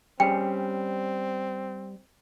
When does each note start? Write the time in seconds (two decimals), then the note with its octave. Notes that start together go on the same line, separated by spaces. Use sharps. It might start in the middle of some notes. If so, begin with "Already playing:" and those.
0.20 G3 C4 C#4 G#4 G5